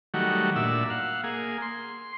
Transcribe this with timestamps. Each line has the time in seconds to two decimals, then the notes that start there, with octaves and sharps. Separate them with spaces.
0.14 D#3 F#3 G3 A3 F#4
0.56 A#2 D4 E5 E6
0.90 F5 F#5
1.23 A#3 G#4
1.62 C6